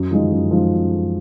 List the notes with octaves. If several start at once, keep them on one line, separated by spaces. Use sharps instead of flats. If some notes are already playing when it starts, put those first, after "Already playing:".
Already playing: F#2
F3 G#3 D#4
F#2
F3 G#3 D#4